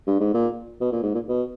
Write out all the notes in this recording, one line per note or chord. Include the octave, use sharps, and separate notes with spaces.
G2
G#2
A#2
B2
A#2
G#2
A#2
B2